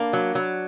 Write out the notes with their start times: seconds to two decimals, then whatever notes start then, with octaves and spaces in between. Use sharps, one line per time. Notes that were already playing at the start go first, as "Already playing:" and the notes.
Already playing: A#3 D4
0.13 F#3
0.35 F#3